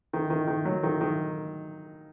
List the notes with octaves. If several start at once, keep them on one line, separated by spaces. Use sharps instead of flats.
D#3
D#3
D#3
F#3
D#3
D#3